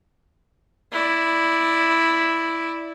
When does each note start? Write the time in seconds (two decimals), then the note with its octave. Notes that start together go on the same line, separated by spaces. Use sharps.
0.92 E4 D5